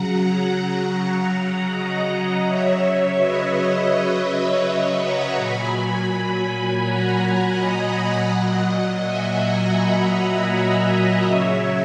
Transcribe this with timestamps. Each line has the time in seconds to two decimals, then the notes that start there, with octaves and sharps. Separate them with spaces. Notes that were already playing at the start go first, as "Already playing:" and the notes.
Already playing: C#3 F#3 F#5 A#5
1.69 D#5 F#5
2.43 C#3 F#3 C#5 E5
3.16 B4 D#5
4.63 C#5 E5
4.99 F#5 A#5
5.36 A#2 F#3 G#5 B5
6.83 F#5 A#5
7.56 D#5 F#5
8.30 A#2 F#3
9.02 E5 G#5
9.39 F#5 A#5
9.77 G#5 B5
10.49 F#5 A#5
11.23 C#3 F#3 C#5 E5